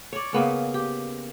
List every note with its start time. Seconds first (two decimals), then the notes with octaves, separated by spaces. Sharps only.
0.13 C#5 D5
0.33 C#3 A#3 B3 C#4
0.74 G4